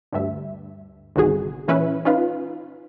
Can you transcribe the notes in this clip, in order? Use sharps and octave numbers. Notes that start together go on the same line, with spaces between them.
D2 G2 E5
G1 C2 D#3 F#4 G#4
A#2 E3 C#4 B4 E5
C#4 D#4 F4 B4 F5